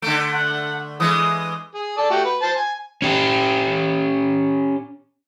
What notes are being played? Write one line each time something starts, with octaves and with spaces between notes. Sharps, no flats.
D3 A3 D7
F#5
E3 G#3 D#6
G#4
A4 D5 A5
A3 F#4 G4
B4
C5 A5
G#5
C#4 G4